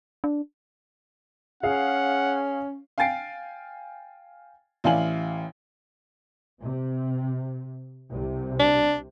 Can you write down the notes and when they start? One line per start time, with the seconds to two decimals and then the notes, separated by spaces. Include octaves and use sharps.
0.24 D4
1.63 C#4 G#4 F5 F#5
2.98 F5 G5 G#5 A6 C7 D7
4.84 A1 E4 D5 F5 G#5 F#7
6.63 C3
8.08 C2 C3
8.59 D4